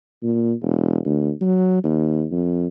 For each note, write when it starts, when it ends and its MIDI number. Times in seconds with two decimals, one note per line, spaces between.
0.23 0.53 46
0.61 0.98 28
1.05 1.30 38
1.41 1.83 54
1.84 2.25 39
2.31 2.67 41